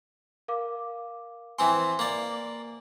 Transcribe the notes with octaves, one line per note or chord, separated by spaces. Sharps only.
A#4 F5 D6
E3 C4 G#5 C6
A#3 D5